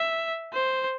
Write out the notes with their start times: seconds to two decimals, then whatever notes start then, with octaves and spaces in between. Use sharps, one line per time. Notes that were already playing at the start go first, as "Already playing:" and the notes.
Already playing: E5
0.54 C5